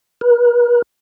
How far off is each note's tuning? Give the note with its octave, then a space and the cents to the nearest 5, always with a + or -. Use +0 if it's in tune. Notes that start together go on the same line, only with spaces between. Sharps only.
B4 -45